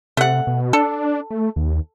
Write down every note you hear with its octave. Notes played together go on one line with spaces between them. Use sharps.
C3 A3 F#5
B2
D4 A4
A3
D#2